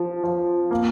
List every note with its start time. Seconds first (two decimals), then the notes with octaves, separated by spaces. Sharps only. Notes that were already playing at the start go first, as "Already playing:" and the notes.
Already playing: F3
0.24 F3
0.71 A#3